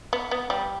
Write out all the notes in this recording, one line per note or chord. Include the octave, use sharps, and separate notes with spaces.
B3
B3
G3